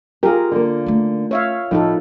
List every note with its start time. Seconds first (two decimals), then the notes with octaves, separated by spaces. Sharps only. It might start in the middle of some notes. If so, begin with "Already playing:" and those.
0.23 F4 G4 G#4 A#4
0.51 D3 A#3
0.86 A3 C#4
1.31 C#5 E5 F5
1.71 A2 F3 B3 D#4 A4